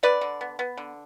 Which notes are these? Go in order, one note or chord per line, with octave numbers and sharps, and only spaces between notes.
D3 B4 D5
D3
B3
B3
D3